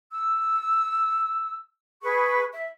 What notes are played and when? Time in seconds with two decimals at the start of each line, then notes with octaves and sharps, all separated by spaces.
0.11 E6
2.02 G#4 B4 C#6
2.52 E5